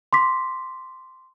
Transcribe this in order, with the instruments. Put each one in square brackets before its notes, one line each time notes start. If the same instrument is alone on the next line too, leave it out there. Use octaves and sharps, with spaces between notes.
[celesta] C6 D6 B6